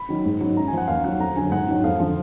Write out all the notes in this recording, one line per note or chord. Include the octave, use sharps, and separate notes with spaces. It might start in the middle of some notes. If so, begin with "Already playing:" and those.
Already playing: B5
D#3 F#3
G#2
D#3 F#3
F#2 A#5
G#5
F3
F#5
D#2 F5
D#3 F#3 F#5
F2 A#5
D3 F#3 G#5
G#2 F#5
D#3 F#3
F2 F5
D3 F3